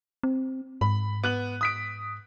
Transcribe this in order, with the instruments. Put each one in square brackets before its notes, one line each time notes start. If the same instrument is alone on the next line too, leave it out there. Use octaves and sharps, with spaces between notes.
[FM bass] C4
[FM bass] G#2 [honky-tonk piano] B5
[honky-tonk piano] B3 F#6 F#7
D#6 B6 D7